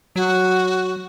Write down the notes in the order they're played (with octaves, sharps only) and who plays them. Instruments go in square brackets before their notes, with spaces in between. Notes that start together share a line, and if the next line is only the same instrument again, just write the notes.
[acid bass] F#3 [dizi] F#4